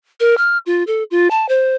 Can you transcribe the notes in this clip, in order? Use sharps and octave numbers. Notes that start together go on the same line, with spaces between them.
A#4
F6
F4
A4
F4
A5
C5